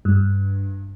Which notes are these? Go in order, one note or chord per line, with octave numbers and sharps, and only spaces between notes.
G2